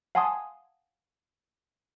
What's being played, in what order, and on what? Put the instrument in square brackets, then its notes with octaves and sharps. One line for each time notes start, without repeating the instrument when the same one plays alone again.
[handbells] F5 F#5 G#5 A5 C6 D#6